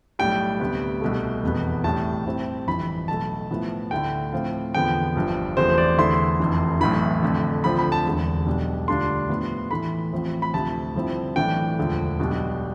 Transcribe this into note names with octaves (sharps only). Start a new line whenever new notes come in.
B1 A2 G3 G5
D2 C3 G3 B3
C2 B2 A3
F1 E2 B2 B3
A1 A2 G3 A5
A2 G3 C4 E4
G1 F2 E3 B5
B1 B2 A3 A5
A2 F3 B3 E4
D2 D3 A3 E4 G5
A2 F3 C4 F4
E2 D3 F3 B3 G5
G1 G2 F3
E2 C3 F3 A3 C5
D5
E2 D3 A3 E4 C6
F1 F2 E3
B1 A2 E3 B5
F2 D3 A3
D2 D3 F3 C4 B5
B5
A5
E1 E2 D3
B1 B2 G3 D4
D2 D3 G3 D4 F4 C6
A2 F3 B3
A2 E3 A3 B5
A1 A2 F3 C4 F4
B5
D2 C3 F3 A5
G2 D3 F3 C4 E4
B1 A2 E3 A3 D4 G5
E1 D2 D3 F3
B1 B2 G3 D4